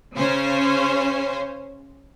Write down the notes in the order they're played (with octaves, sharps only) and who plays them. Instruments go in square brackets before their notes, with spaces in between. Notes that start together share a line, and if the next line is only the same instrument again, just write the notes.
[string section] C#3 C#4 C5 C#5